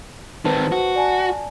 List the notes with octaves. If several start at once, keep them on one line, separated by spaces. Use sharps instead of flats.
D#3 C4 B4 C5 A5
F#4
D5 G#5 A5